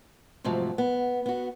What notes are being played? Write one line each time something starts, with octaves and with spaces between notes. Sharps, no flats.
G#2 C3 F3 F#3 A3
B3
B3 F#4